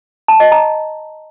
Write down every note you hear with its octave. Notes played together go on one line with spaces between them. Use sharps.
A5
D#5
A#5